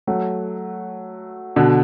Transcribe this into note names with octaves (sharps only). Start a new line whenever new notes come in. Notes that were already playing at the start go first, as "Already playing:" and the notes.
F#3 A3
B2 D3